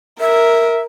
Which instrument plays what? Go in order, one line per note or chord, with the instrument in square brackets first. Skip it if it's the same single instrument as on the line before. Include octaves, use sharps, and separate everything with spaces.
[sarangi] A#4 [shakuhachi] E5